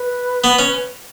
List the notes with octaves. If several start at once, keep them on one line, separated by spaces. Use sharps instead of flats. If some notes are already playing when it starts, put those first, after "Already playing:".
Already playing: B4
B3
C#4